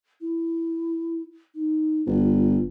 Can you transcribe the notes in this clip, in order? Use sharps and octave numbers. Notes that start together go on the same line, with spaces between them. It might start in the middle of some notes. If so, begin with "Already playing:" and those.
E4
D#4
G1 F4